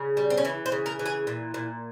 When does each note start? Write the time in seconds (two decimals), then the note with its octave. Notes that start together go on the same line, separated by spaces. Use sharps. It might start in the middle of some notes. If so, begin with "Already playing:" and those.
Already playing: C#3
0.17 G3
0.30 C4
0.37 C#4
0.45 E3 E4
0.66 C5
0.72 C#3
0.86 A#4
0.99 E3
1.06 G#4
1.27 A#2
1.54 A#2